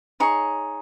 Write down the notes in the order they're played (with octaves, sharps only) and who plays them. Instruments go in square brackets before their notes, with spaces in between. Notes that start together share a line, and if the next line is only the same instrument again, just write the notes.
[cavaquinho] D#4 G#4 C#5 C#6